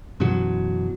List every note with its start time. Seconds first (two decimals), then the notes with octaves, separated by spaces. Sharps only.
0.20 F#2 B2 E3 F#3